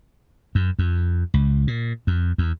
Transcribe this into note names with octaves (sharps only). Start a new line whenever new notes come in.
F#2
F2
C#2
A#2
F2
E2